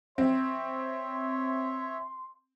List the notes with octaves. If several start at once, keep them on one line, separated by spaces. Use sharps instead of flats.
C4 C#5 E5 C6